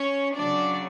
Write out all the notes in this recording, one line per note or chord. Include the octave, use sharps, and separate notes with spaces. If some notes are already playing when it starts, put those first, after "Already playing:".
Already playing: C#4 C#5
F#3 D4 D5
C#3